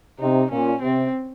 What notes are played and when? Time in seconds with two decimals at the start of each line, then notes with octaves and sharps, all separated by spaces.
0.20 C3 D#4
0.51 A#2 C#4
0.82 C3 C4